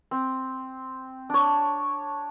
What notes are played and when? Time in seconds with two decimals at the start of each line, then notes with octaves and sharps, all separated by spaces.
0.11 C4
1.30 D4 C#5